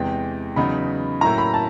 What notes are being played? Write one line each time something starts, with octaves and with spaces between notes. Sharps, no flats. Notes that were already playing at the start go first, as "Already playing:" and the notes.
Already playing: E2 C3 E3 G#3 G5
E2 C#3 F#3 B3 D#4 B5
A2 F#3 A#3 C#4 E4 A#5
B5
A5